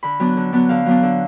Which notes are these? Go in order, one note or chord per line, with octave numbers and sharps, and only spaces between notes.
D3 B5
F#3 B3 D4
D3
F#3 B3 D4
D3 F5
F#3 B3 D4
D3